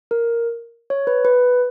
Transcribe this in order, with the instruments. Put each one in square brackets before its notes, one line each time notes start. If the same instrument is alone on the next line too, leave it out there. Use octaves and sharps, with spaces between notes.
[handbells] A#4
C#5
B4
B4